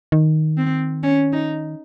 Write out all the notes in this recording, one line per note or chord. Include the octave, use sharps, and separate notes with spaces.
D#3
C4
C#4
D#4